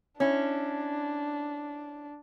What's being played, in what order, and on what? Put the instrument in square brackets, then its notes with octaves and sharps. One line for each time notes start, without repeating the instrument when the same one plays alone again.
[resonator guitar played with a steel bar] C#4 E4 [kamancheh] D4